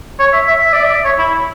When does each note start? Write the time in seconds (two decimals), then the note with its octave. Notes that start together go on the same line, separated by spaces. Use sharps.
0.19 C#5
0.33 E5
0.48 E5
0.62 E5
0.73 D5
0.83 E5
1.05 C#5
1.19 E4